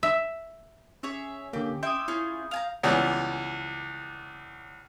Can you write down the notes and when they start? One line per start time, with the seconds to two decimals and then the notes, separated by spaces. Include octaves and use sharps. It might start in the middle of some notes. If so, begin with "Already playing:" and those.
0.03 E5
1.03 C#4 G#4 C#5 E5
1.53 D3 A#3 G4
1.83 E4 G4 E5 C6 D#6 G6
2.08 C#4 E4 F4 G#4
2.51 F5 G#5 A#5
2.83 C#2 E3 G3 B3 C#4